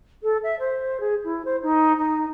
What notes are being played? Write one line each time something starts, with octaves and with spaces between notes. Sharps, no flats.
A4
E5
C5
G#4
E4
C5
D#4
D#4